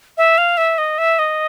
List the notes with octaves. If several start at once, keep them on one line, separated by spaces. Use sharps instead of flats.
E5
F5
E5
D#5
E5
D#5